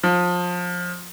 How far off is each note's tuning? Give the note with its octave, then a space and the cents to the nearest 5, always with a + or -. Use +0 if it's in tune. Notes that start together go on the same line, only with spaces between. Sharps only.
F3 +25